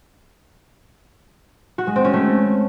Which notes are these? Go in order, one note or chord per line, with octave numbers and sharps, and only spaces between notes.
F#4
G#3
C4
C#4
A3